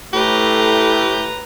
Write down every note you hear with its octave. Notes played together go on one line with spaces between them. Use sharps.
A2 A3 G4 B4 A#5